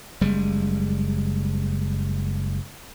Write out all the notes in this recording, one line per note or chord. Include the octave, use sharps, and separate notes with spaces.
F#1 G3 G#3